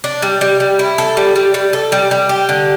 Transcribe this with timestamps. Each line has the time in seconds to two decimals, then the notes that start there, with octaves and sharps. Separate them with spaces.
0.04 D4
0.22 G3
0.41 G3
0.60 G3
0.79 E4
0.98 A4
1.17 G3
1.36 G3
1.54 G3
1.73 A4
1.92 G3
2.11 G3
2.29 G4
2.49 D3